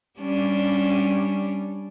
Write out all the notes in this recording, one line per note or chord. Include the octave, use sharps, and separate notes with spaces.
G3 C#4 D4